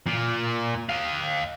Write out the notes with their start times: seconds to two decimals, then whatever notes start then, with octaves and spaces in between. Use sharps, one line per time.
0.06 A#2
0.89 D#5 F5